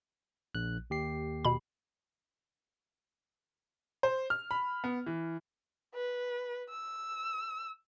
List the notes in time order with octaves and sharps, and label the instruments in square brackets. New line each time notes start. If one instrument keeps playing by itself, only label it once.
[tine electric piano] A#1 F#6
D#2 G4 C7
[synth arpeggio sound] B2 B5
[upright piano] C5
F6
B5
B3
E3
[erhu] B4
E6